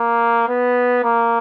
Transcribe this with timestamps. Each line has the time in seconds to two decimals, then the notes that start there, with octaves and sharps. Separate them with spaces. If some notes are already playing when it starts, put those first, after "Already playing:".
Already playing: A#3
0.48 B3
1.04 A#3